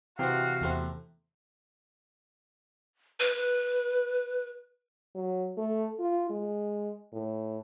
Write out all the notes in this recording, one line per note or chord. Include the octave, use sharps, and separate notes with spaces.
C3 E3 C4 F#4 F5 G5
E2 A3 C4
B4
F#3
A3
F4
G#3
A2